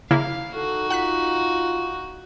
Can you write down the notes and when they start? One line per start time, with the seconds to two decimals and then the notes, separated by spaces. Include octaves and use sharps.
0.11 C#3 A#3 E4 F5
0.55 D#4 F#4 A4
0.90 F4 F#5 F#6 B6